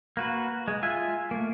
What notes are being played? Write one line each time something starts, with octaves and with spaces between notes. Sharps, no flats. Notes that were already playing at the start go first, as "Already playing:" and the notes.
A#3 F#4 B4
G#3
F4 E5 G#5
A3 A#3